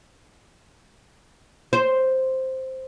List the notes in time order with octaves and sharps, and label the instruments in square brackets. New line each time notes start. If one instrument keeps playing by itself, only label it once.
[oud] C5